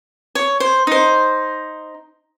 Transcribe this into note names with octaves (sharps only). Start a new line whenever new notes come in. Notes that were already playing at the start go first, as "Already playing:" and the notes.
C#5
C5
D#4 C5